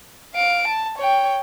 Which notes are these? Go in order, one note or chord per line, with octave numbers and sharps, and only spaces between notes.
F5 D7
A5
C#5 G5